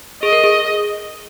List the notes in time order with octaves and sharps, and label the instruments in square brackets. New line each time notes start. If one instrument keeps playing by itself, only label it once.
[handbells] G#4 [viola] D#5
[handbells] A#4
G#4